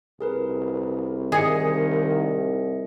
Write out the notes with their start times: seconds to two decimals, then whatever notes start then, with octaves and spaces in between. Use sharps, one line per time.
0.21 C2 G#4 A#4 B4
1.32 C2 D#3 G#4 D#5 C#7